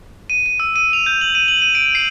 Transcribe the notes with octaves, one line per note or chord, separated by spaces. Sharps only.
D#7
D#7
E6
D#7
F7
G6
F#7
D#7
F#7
D#7
D7
C7